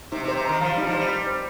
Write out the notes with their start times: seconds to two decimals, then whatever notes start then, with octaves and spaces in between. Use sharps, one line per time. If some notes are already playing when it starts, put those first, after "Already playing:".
0.12 C3 D#4
0.24 C3
0.28 C5
0.37 C3
0.45 D#3 A#5
0.61 F3 F5
0.74 G3 D#4
0.87 F3
0.94 G3 C5
1.10 D#4
1.27 C5